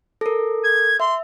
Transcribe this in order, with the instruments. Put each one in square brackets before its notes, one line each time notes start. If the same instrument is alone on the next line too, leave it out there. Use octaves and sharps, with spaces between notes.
[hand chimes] A4 A#4
[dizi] G#6
[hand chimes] E5 [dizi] C6